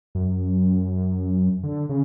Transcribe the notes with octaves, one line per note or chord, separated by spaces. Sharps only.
F#2
D3
C#3